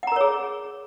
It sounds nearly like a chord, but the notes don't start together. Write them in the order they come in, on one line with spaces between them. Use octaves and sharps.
F#5 A#5 A#4 C#5 G#4